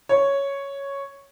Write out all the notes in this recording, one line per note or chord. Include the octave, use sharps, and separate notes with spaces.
C#5